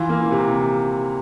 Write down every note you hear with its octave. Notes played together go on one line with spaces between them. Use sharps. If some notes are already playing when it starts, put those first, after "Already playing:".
Already playing: E3 F4
A#3
C3